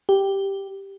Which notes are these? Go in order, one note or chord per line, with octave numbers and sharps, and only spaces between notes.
G4